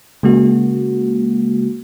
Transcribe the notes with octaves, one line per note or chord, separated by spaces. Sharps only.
C#3 G#3 A#3 F#4